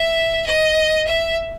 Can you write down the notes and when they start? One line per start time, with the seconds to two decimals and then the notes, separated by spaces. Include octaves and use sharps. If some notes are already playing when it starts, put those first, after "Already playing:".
Already playing: E5
0.46 D#5
1.07 E5